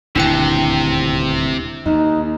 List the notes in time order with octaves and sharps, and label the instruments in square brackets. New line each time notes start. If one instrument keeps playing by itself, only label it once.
[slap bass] D#1 D2 G2 [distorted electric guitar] C3 [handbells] D4 E4 G5
[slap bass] D#2 [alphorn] D#4